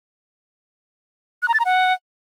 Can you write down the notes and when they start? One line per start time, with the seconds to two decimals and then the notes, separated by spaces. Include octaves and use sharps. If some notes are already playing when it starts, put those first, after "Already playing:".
1.42 F#6
1.48 A#5
1.54 A6
1.59 A#5
1.65 F#5